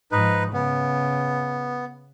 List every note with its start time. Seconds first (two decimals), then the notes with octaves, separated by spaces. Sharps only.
0.12 G#2 F3 D#4 B4
0.54 C#3 B3